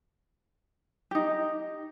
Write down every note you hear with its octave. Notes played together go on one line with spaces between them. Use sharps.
D#4 G4